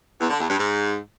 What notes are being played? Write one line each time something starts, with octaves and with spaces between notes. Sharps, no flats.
E2
D3
E2
G2
G#2